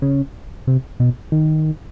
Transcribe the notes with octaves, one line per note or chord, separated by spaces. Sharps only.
C#3
C3
B2
D#3